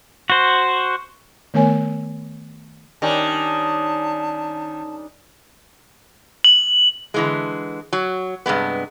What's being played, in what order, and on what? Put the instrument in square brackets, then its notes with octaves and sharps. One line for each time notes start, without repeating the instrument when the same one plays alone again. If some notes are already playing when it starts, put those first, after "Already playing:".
[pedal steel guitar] F#4 C5
[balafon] D#3 A3 B3 A#4 C#5 G#5
[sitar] D#3 [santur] G3 C#4 D4 [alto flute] A5
[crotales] F#7
[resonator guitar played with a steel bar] D3 E3 G#3
F#3
G2 C3 G#3 B3